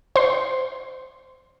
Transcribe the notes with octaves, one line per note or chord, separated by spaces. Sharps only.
C5 C6